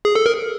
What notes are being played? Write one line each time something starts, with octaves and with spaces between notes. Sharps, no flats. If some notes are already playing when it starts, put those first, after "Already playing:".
G#4
A4
A#4